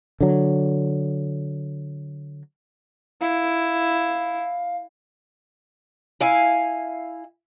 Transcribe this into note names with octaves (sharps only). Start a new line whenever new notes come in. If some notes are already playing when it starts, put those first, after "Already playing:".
D3 F#3
E4 F5
E4 F5 G#5